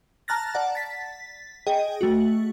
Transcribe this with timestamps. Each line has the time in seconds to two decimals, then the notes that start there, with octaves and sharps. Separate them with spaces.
0.28 A5 A#5 F6 F#6 A6 A#6
0.54 D5 F#5 A5
0.75 A6 B6
1.67 G#4 D#5 G5
2.01 A3 F#4